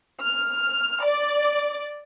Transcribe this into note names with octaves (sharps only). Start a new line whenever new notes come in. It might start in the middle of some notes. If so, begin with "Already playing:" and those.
F6
D5